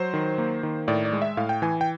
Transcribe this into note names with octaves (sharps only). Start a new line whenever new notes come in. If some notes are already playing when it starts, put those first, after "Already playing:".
Already playing: F#3 C5
D#3
A#3
D#3
A2 D5
D5
G#3
E5
A2 F5
G5
E3 G#5
G5